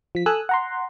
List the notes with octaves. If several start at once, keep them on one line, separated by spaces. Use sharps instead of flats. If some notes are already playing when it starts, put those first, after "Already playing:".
F3 B6
A4 G#5 D#6 E6 F#6
F#5 A#5 C6